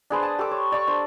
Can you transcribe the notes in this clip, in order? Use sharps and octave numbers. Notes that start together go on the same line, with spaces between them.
D4 G#4 B4 C5
A5 D#6
G4 A4 D6 E6
C#5
D5 C#6
D4 C5